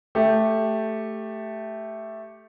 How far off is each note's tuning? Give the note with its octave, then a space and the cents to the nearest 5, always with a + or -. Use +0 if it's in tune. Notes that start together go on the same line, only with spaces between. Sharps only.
A3 +0 G4 +0